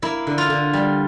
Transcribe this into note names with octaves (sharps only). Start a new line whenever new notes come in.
A#3 E4
D3
F4
D3
G3